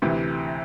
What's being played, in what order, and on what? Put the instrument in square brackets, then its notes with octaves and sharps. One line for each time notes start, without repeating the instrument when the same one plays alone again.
[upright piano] D2 C3 E3